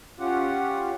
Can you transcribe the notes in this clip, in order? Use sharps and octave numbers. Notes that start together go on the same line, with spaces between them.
C#4 F4 G4 F#5